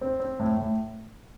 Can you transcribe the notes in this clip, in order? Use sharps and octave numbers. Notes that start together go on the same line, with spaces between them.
C4
C4
A2
A2